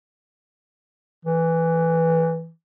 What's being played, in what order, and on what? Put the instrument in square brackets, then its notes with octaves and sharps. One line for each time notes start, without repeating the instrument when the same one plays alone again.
[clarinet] E3